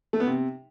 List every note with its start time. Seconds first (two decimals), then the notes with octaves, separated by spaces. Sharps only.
0.13 A3
0.20 B3
0.27 C3